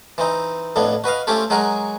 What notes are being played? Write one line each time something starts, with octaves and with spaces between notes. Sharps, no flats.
E3 C4 D#4
F2 A2 B3 D4
F#4 B4 D#5 F5
A3 C4 C#4 F4 G4 A4
F#3 G#3 F#4 G#4 A#4